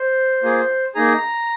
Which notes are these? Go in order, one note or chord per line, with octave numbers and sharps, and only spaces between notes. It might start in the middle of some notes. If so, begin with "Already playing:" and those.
Already playing: C5
A#3 F4 G#4
A#3 D#4 G#4 A#5